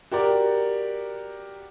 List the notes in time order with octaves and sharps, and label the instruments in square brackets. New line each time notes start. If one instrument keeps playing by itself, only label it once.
[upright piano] F#4 G4 A#4 D5